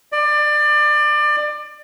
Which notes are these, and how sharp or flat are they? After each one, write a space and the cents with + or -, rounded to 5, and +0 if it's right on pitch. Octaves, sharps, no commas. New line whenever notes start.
D5 +25